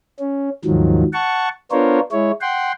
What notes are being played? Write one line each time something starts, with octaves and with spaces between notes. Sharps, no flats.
C#4
D#2 G#2 D#3 F3 F#3
F#5 A5 C#6
B3 D4 F4 A#4 C5 C#5
G#3 E4 C#5
F#5 G5 C6